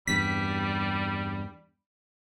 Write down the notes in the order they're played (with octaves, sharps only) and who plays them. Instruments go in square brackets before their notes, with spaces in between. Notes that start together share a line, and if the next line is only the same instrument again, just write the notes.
[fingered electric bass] E2 G2 [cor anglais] G3 [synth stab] B6